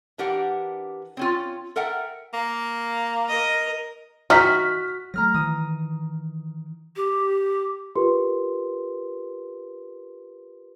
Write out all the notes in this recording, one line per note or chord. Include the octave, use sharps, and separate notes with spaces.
E3 D4 G4 A#4 F#5
C4 C#4 F4
A4 A#4 E5 F#5 G5
A#3
A#4 D#5
E3 D#4 F#4 F6 B6
F#3 G#3 A3 A#5 F6 A#6
D#3 E3 D#6
G4
F4 G4 A#4 B4 C6